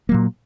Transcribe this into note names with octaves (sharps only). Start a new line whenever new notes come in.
A#2 F#3 A#3